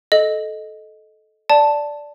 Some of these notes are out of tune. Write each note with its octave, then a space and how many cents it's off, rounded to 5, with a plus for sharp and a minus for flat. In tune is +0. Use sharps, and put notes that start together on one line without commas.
A4 -15 D#5 +0
D5 -5 A5 +0